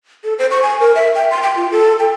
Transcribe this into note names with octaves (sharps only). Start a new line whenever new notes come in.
A4
C5
C#6
G#5
A#4
E5
G5
C6
G5
F4
A4
G5